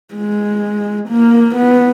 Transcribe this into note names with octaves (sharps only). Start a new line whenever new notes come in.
G#3
A#3
B3